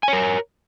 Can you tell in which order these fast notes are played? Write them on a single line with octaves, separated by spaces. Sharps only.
G#5 C#5 A#4